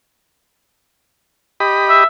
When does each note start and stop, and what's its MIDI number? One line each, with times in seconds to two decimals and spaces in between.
1.60 2.04 67
1.60 2.04 75
1.60 2.04 83
1.90 2.06 76